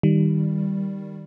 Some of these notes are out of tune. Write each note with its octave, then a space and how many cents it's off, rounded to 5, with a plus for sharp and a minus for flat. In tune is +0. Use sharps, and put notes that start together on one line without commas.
D#3 +0 G3 +0